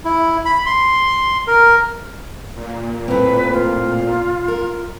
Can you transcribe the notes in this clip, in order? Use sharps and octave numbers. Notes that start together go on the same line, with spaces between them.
E4
B5
C6
A#4
A#2
A2 C4 B4
F4
A#4